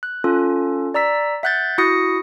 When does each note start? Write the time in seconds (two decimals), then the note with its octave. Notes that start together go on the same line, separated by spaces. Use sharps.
0.03 F#6
0.24 C#4 F4 A4
0.94 D5 A#5 E6 B6
1.43 E5 F#5 F#6 G6 A6
1.78 E4 F#4 D#6 A#6 C#7